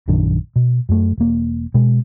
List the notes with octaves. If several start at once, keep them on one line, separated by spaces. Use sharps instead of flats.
A#1 F#2 D#3 D4
B2
F#2 A3
E1 A#3
B2 G#3